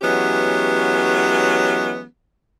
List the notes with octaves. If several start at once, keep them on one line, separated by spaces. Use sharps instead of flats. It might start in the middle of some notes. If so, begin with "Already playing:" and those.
E3 F#3 G#3 B3 C#4 G4